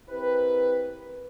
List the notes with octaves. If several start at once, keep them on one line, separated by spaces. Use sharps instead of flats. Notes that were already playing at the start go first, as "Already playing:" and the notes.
C4 E4 G4 A#4 B4